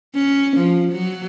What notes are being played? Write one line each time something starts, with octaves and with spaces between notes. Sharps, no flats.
C#4
F3
F#3